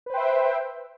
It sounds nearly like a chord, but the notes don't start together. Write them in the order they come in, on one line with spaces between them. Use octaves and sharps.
B4 C5 G5 E5